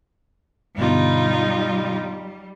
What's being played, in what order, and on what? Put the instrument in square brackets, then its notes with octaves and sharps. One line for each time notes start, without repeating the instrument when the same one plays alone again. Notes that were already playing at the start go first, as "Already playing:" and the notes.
[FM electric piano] G2 B2 D3 [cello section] G3 [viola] D#4 F4